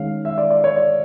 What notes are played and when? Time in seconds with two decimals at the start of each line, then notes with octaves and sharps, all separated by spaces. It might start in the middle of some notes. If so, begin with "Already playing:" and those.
Already playing: D#3 G#3 C#4 F5
0.25 E5
0.38 D5
0.50 D5
0.64 C#5
0.76 D5